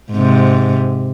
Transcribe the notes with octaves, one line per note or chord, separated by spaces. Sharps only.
G#2 C3